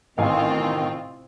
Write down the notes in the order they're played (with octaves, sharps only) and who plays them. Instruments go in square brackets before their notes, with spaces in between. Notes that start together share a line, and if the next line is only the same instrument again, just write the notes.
[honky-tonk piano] A1 F5 G#5 [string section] C3 C4 F4 [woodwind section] D#3